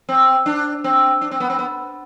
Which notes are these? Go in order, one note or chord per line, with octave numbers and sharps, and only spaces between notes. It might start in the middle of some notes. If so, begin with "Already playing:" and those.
C4
D4
C4
D4
C4
B3
C4
B3